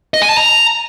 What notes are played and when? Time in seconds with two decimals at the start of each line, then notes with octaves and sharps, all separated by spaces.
0.14 D#5
0.22 G#5
0.30 A5
0.37 A#5